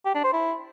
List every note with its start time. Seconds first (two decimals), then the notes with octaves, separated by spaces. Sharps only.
0.05 G4
0.15 D4
0.24 C5
0.33 E4